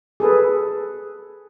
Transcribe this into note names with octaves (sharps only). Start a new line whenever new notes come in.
G#4 A4 B4